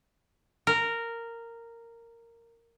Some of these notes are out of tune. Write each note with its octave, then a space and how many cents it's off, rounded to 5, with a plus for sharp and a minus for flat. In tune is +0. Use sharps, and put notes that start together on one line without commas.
A#4 -10